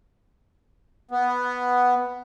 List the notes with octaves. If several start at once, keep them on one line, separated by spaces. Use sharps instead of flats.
B3